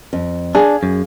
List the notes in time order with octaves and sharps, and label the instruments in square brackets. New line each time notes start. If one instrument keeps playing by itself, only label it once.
[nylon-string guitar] F2
[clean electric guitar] D4 [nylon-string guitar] G#4 F5
[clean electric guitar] F#2